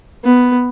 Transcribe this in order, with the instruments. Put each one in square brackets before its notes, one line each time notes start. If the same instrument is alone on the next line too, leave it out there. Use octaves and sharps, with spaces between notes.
[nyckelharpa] B3